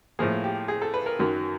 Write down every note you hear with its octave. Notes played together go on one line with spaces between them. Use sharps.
A2 F3 A#3 G#4
G4
G#4
A4
B4
A#4
F#2 D#3 F#3